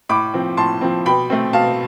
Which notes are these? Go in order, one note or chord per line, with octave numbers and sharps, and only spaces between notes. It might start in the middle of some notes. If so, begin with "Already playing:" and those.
A2 B5 D6
F3 C4
A2 A5 C6
F3 C4
B2 G5 B5
A3 C4
B2 F5 A5